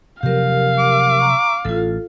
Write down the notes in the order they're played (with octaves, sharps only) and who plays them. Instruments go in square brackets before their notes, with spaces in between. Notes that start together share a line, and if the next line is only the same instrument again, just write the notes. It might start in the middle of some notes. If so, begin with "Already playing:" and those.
[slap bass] C3 F3 F#3 [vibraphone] G4 A#4 [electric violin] F5
[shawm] D6
[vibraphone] A#5 C#6
[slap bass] A1 [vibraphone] F4 A4